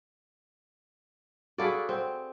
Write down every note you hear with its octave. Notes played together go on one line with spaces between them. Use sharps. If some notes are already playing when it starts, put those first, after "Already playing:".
F#4 G#4 A4 D5 F5 B5
C4 F#5